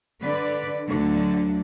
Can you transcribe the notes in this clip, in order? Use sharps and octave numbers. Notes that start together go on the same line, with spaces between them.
D3 B4 D5
D2 D3 F#3